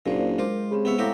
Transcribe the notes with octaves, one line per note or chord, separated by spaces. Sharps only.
F#1 A#2 F#3 D4 C5 D5 F5
G#3 F4 A#4 C5 D6
C#3 C4 G4 B5
B3 E4 C#5
A2 C4 F#4 G4 F5 A#5